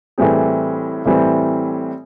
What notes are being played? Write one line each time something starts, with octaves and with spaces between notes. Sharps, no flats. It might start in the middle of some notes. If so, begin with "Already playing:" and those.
A2 E3 G3 C4 G#4
A2 E3 G3 C4